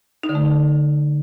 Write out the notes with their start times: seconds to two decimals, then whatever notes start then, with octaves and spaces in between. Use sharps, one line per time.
0.23 D#4
0.29 D3
0.35 A3